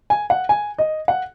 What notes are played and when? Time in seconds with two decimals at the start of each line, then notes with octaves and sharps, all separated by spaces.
0.10 G#5
0.30 F#5
0.49 G#5
0.78 D#5
1.08 F#5